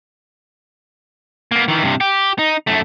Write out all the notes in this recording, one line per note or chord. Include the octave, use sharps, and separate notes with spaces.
A#3 B3
D#3 E3
G2 C3
G4
D#4
F#2 A3